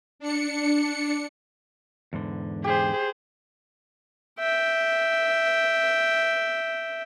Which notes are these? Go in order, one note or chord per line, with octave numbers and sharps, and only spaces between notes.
D4 C#7
E2 G#2 D3
G4 G#4 C5
E5 G5